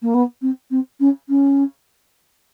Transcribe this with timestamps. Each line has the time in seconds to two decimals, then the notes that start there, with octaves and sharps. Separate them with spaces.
0.02 A#3
0.14 B3
0.42 C4
0.70 C4
1.00 C#4
1.29 C#4